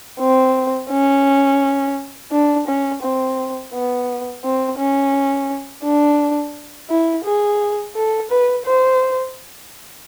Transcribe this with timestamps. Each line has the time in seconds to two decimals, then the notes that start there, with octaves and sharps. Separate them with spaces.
0.20 C4
0.91 C#4
2.32 D4
2.67 C#4
3.03 C4
3.73 B3
4.44 C4
4.78 C#4
5.84 D4
6.89 E4
7.25 G#4
7.95 A4
8.30 B4
8.66 C5